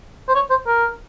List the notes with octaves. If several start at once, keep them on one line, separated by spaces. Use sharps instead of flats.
C5
C#5
C5
A#4